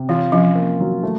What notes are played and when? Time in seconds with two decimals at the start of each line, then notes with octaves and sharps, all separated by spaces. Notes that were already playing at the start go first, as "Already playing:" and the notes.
Already playing: C3
0.09 E3 F4
0.32 F3 C#4
0.55 A#3
0.80 F#3
1.03 A3